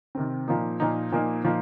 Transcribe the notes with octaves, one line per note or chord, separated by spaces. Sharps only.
C3 D#3 C4
A#2 F3 A#3 D#4
A#2 F3 A#3 D#4
A#2 F3 A#3 D#4
A#2 F3 A#3 D#4